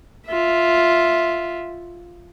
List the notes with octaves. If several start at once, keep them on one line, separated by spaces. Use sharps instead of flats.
F4 E5